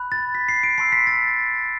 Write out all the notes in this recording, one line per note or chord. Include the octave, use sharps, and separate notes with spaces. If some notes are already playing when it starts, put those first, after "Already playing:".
Already playing: B5 F#6
A6
B6
C7
D7
A5 C6 E6 C7
B6
A6